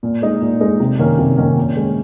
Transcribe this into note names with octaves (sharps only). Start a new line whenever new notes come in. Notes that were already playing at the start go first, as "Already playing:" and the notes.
A#2
G#3 D#4
A#2
G#3 D#4
C3
D#3 A#3 C#4
C3
D#3 A#3 C#4
A#2
G#3 C#4